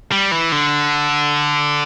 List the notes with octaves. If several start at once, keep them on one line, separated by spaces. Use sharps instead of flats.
G3
E3
D3